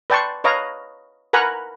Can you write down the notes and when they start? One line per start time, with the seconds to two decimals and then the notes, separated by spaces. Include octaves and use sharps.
0.10 B4 D5 G5 A5 C6 C#6
0.44 B4 C#5 D#5 F5 A#5
1.33 A#4 B4 F#5 G#5 A#5 B5